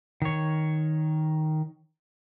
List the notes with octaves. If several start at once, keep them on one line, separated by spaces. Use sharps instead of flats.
D#3 C#5